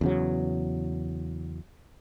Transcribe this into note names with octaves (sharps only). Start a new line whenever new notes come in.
E2 C#3 F#3